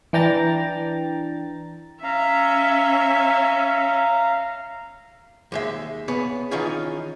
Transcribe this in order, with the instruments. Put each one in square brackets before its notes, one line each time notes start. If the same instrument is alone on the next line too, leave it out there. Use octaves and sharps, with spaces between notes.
[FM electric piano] E3 D4 G5 A#5 A6
[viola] C#4 E5 [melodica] F5 A#5
[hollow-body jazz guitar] D#2 G#3 E5
B3 G#4 C#5
D#3 E3 C#4 D#4 F4 G#4